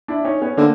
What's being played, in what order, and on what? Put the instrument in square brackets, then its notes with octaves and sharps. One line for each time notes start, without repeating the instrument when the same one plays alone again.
[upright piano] D4 E4
C#4 D#4
B3 C#4
[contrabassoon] D3 [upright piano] A#3 C4